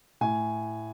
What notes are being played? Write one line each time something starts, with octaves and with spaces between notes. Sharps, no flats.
A2 G#5